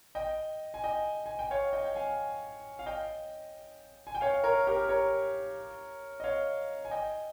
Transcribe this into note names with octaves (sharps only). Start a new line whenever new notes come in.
D#5 G5
G#5
D#5 G5
G#5
G5
C#5 F5
D#5 G5
G5
F5 G#5
F5
D#5 G5
G#5
G5
C#5 F5
A#4 C#5
G4 A#4
A#4 C#5
D#5
C#5 F5
G#5
D#5 G5